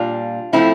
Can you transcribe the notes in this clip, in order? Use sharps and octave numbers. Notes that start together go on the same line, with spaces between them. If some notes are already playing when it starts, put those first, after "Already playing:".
Already playing: A#2 G3 D4 F4
A2 F3 A3 C4 E4